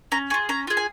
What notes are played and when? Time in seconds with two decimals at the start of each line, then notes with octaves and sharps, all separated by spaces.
0.12 C#4 A#5
0.30 G#4 C#6
0.34 F4
0.49 C#4 A#5
0.67 F4 G#4
0.77 G#5